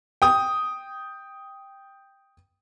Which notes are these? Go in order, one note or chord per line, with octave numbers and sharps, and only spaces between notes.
G5 D#6